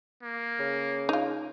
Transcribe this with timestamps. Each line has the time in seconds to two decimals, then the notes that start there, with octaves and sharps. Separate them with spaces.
0.23 A#3
0.59 C#3
1.09 D#4 F4